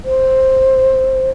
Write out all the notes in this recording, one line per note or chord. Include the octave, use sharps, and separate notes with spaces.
C5